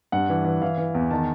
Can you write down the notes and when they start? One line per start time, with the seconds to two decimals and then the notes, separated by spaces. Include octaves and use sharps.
0.12 G2 F#5
0.29 E3
0.45 E3
0.62 E3 F5
0.78 E3
0.95 E2
1.11 D#3 A5